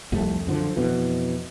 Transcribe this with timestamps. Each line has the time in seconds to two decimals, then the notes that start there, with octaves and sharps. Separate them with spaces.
0.12 C2 F2 A3
0.47 F#2 D3 F3
0.77 F2 B2 E3